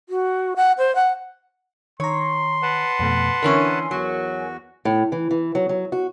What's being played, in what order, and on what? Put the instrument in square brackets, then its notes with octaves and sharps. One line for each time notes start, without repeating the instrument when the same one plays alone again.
[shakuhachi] F#4
F#5
C5
F#5
[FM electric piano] D#3 A#5 [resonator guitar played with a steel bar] C#5 [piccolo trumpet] C6
[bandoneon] B4 F#5 A5
[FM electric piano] F2 B2 A3
[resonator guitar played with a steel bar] D3 E3 C#4 [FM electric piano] A#4 C#5 G#5
[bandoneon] E2 F#4 [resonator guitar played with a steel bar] F#3
[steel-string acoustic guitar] A2
E3
E3
F#3
F#3
F#4